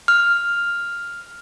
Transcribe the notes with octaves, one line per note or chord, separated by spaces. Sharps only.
F6